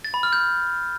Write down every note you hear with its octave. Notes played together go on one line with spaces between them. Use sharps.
A6
B5
F6
G6